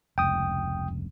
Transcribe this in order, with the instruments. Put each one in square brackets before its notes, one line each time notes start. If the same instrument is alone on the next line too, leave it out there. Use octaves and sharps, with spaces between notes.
[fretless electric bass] F1 C#2 G2 [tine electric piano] G5 D#6